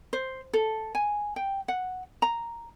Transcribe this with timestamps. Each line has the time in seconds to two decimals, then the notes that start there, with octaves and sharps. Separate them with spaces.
0.13 C5
0.53 A4
0.95 G#5
1.36 G5
1.68 F#5
2.22 A#5